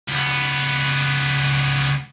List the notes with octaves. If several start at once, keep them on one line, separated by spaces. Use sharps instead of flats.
C#2 B3